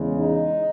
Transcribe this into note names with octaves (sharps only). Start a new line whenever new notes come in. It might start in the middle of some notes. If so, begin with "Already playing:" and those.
Already playing: E2 C#3 G#3
D#4